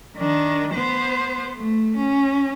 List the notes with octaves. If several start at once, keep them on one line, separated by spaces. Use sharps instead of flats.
D#3 D4
B3 C5
A3
C#4